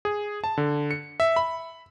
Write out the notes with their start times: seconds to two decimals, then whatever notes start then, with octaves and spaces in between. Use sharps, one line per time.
0.05 G#4
0.44 A5
0.58 D3
0.91 C#7
1.20 E5
1.36 B5